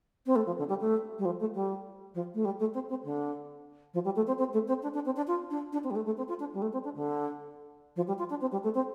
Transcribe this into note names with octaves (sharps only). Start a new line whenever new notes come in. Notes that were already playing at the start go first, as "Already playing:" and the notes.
C4
A3
F3
D3
G3
A3
G3
F3
A3
G3
F3
A3
G3
A3
C4
C4
D3
F3
G3
A3
C4
C4
A3
C4
D4
D4
C4
D4
F4
D4
D4
C4
G3
A3
A3
C4
F4
D4
G3
A3
C4
D4
D3
F3
G3
F4
D4
C4
G3
A3
C4